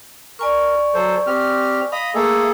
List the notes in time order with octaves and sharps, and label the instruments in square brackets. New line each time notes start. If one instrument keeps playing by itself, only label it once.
[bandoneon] A#4 [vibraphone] D5 G#5 C#6
[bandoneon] F#3 A4 C5
C4 G4 F6
[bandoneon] D#5 [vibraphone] F5 [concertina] B5 D#6
[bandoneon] A3 [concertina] A#3 G#4 A4